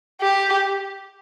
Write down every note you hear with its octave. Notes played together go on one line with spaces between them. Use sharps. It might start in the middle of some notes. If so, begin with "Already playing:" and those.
G4